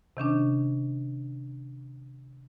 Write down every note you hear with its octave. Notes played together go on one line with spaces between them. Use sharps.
C3 D#3 C#4 D4